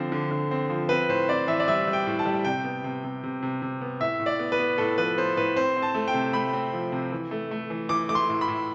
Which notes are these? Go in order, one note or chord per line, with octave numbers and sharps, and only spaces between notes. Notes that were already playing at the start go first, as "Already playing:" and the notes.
Already playing: D3 F3 C4
D3
D3
C4
F3
C4 B4
A2 C5
C4 D5
E3 E5
D5
G3 E5
G3
G5
A2
A5
G3
C3 G5
B3
C3
C3
C3
C3
C3
B3
A2 E5
A2
D5
B3
B4
B3
A2 A4
F3 B4
B3 C5
A2 B4
C4 C5
C4
A5
A3
G5
C3
A3 B5
C4
F3
C3
E3
A3
A3
E3
E3 D6
A3 D6
C6
A2
B5
A2